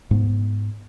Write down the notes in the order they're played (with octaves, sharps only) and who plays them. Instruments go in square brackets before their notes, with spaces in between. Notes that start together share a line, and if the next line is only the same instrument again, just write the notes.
[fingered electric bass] G#2 B3